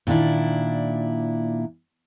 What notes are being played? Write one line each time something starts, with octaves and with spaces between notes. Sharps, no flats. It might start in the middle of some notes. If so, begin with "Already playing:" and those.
A#2 D#3 D4 E4